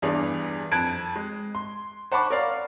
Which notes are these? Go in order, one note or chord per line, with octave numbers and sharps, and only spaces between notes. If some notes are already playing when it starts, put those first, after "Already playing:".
E2 G2 E3 D4 G#4
F2 A5 F#6 G#6 D7
G#3
C6
C5 F#5 A5 B5 C#6 D6
A#4 C#5 D5 F5